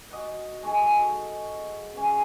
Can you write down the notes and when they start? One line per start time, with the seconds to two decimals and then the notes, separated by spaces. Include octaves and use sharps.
0.11 F#4 D#5 F#5
0.63 G#3 F#4 G#4 A4
1.94 C#3 E3 C#4